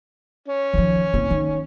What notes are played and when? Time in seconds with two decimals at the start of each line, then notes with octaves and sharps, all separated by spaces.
0.48 C#4
0.74 D#3 F3
1.14 F#1 C4
1.31 D#3